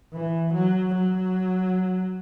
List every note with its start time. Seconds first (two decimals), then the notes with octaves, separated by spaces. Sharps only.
0.13 E3
0.53 F#3
0.94 F#3